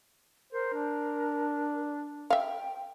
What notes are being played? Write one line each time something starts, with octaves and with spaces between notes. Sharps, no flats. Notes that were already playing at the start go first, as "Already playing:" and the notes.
A#4 C5
D4
E5 F5 G5